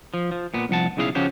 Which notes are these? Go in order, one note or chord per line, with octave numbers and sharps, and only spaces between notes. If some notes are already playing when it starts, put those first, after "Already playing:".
F3
F3
A#2 B3
C2 F3 F#5 A5
B1 C#3 E4 G#4 C5 F5
C#3 F3 C#4 F#4 G4